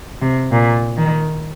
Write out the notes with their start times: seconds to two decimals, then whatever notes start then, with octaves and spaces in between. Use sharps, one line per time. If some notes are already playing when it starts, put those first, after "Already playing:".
0.21 C3
0.52 A#2
0.97 D#3